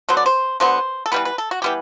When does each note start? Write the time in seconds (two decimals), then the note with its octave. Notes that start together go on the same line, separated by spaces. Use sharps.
0.09 D3 F#3 B3 C5
0.17 D5
0.26 C5
0.60 D3 F#3 B3 C5
1.06 A4
1.12 E3 G3 B3 B4
1.25 B4
1.38 A4
1.51 F#4
1.62 E3 G3 B3 G4